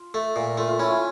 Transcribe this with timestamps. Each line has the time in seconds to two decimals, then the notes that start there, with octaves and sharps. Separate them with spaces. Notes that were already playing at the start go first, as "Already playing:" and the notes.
Already playing: F4
0.14 A3
0.36 A#2
0.57 A3 F4
0.68 F4
0.79 C#4 E4
0.90 F4